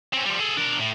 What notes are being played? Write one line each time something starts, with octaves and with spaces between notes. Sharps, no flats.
C4 C#4
F3 G3
G#4 A4
D4 A#4
A2